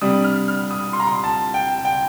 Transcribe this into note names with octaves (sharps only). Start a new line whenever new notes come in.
C3 G3 D4 D#6
F6
F6
D#6
C6
A#5
C6
A5
G5
G5